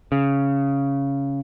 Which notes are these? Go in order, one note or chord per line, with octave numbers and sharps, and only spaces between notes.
C#3